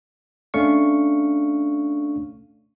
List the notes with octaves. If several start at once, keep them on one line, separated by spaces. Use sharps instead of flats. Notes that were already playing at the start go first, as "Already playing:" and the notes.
A3 C#4 D4 F5 C#6